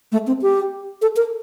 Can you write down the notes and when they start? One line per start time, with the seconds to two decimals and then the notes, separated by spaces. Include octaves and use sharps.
0.12 A3
0.27 C4
0.42 G4
1.02 A4
1.16 A#4